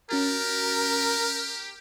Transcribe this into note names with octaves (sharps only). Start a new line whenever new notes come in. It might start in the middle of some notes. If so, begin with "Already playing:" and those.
C#4 F#4 G4 A#4 A6